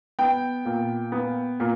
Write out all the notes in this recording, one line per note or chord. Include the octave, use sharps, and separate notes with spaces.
B3 G5
A#2
B3
A#2